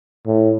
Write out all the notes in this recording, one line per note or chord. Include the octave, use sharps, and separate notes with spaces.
A2